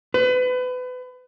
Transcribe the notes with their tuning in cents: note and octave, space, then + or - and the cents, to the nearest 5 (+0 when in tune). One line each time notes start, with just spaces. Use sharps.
B4 +30